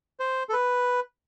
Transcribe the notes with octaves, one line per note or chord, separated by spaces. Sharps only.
C5
A4
B4